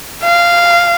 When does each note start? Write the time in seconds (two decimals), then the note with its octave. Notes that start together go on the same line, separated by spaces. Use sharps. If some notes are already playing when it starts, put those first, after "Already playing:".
0.23 F5